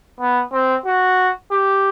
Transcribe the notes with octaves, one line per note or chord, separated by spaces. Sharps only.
B3
C4
F#4
G4